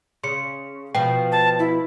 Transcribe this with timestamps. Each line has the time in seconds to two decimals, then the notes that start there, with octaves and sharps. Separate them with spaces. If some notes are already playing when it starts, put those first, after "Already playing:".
0.24 C#3 C6 C#7
0.95 B2 F3 G5
1.32 A5
1.59 E4